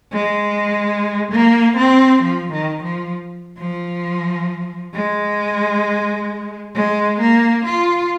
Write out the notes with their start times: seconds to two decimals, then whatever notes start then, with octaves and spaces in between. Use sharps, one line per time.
0.12 G#3
1.32 A#3
1.77 C4
2.23 F3
2.52 D#3
2.83 F3
3.58 F3
4.94 G#3
6.75 G#3
7.20 A#3
7.65 F4